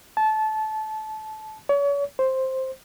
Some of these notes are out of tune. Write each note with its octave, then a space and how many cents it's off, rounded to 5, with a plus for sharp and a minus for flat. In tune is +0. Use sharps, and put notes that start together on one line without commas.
A5 -20
C#5 +40
C5 +5